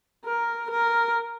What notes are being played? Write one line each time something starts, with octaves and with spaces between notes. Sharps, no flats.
A#4
A#4